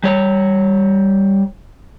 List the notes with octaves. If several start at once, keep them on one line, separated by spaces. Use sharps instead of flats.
G3 C#5